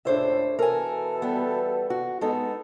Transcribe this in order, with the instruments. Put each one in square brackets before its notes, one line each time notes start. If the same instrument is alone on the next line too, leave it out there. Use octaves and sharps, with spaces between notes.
[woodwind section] C#2 A2 [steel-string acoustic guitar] D4 C5 E5
[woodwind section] B2 E3 A4 [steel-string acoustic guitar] A#4 G#5
[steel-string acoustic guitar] G3 B3
F#4
[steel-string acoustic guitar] G#3 B3 D#4 [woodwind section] A4